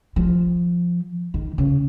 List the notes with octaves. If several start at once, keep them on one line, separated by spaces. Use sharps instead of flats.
F3
D#3
C#3